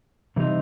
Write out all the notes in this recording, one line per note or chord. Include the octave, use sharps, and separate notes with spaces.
C3 E3 G3 C4 D#4